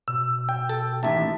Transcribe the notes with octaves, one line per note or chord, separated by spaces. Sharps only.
B2 E6
G5
A4
A1 D#2 E5 A5